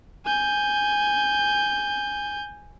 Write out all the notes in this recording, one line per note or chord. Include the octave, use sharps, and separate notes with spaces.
G#5 G6